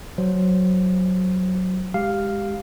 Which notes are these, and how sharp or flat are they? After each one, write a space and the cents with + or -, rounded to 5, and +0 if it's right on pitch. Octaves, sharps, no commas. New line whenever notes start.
F#3 +0 C5 +0
G#3 -15 G4 +0 F5 +0